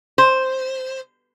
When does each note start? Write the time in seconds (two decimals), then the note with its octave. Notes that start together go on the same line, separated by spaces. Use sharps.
0.18 C5